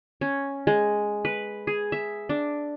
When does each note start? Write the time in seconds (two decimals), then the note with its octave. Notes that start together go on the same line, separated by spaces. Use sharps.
0.21 C#4
0.67 G#3
1.25 B4
1.67 G#4
1.92 E5
2.29 D4